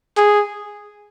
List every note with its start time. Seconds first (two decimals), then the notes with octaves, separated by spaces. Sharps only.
0.17 G#4